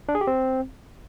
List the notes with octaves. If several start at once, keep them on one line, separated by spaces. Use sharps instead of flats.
D4
G#4
G4
C4